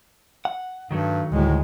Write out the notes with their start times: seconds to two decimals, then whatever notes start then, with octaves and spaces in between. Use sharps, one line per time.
0.45 F#5
0.91 G2 D#3 F#3 A3
1.32 D2 A2 G#3